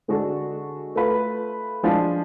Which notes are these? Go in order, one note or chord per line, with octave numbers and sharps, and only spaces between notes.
D3 G#3 D4 F#4 A4
A3 F4 B4
F3 G#3 D4 F4